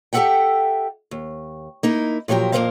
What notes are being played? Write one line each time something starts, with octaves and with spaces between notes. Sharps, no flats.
G4 A4 A#4 E5 F#5 G5
D#2
A#3 D#4 E4
A#2 F3 F#3 G4 A#4
F2 A#2 G3 A#4 C5 F5